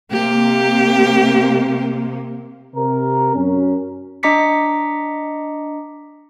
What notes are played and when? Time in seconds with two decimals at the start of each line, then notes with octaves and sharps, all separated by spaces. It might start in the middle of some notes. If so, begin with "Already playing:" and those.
0.12 C3 A#3 G4
2.75 C3 A#4
3.35 F#2 C#4
4.23 D4 D#5 A#5 D6 B6 C#7